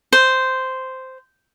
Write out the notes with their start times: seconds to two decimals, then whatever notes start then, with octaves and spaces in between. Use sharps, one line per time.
0.13 C5